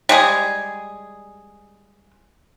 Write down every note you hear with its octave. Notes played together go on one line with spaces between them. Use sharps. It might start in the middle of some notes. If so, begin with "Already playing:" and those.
G3 G#3 G#4